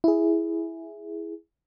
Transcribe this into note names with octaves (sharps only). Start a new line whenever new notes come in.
E4 G#4